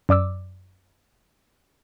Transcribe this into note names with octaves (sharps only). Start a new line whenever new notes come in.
F#2 D5 D6 E6